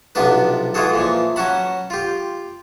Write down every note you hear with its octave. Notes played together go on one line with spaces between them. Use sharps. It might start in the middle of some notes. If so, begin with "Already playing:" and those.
B1 C3 F3 B3 D4 B4
E3 G#3 F4 F#4 G#4 A4
A#2 E3 F3
F#3 C#4 F#4 F#5 A5 B5
F4 G4